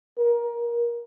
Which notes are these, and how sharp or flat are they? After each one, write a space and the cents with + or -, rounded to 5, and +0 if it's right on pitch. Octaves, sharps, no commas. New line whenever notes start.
A#4 +20